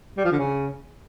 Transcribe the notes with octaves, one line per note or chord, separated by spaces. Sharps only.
G3
F3
D3
C#3